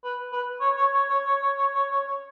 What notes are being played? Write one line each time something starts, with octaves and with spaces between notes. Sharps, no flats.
B4
B4
C#5
C#5
C#5
C#5
C#5
C#5
C#5
C#5
C#5
C#5